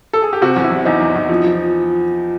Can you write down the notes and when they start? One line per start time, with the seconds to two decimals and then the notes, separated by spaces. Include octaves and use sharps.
0.13 A4
0.22 G#4
0.33 G4
0.42 C3 F#4
0.56 E2
0.64 E4
0.71 E2
0.85 E2 D#4
1.01 E2
1.15 E2
1.29 F3
1.44 F3